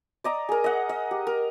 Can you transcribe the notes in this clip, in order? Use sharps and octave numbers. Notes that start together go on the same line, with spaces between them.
D5 D#5 A#5
G#4 A#4
D#5 F#5
D#5
G4
A#4